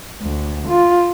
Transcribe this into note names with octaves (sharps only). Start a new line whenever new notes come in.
D2
F4